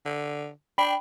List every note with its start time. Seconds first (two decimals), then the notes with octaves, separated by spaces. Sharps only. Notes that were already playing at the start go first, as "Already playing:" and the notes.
0.05 D3
0.78 D4 G5 B5